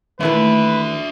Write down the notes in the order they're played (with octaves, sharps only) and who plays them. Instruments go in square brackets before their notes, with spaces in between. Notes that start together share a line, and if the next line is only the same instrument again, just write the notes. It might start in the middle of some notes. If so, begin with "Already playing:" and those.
[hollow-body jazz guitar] D#3 E3 A4 [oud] A3 A#3 [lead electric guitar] D4 E5 [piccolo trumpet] B4